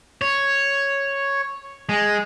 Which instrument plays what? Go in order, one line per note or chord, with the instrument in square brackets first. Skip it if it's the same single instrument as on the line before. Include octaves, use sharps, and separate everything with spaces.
[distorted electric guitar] C#5
G#3